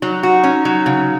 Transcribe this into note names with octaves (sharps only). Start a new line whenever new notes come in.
F#3 D#4
F#4
C#4
F#3
C#3